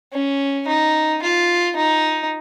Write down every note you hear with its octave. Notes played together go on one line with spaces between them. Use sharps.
C#4
D#4
F4
D#4